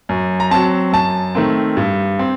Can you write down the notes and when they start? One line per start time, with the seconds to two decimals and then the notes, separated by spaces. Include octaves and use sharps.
0.09 F#2
0.40 A#5
0.51 F#3 C4 A5
0.92 F#2 A5
1.35 D#3 A3 C4
1.77 G2
2.19 C4